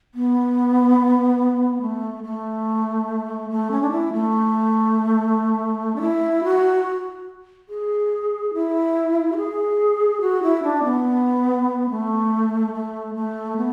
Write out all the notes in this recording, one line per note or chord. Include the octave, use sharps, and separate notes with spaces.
B3
A3
A3
A3
C#4
D4
E4
A3
D4
E4
F#4
G#4
E4
F#4
G#4
F#4
E4
D4
B3
A3
A3
A3
B3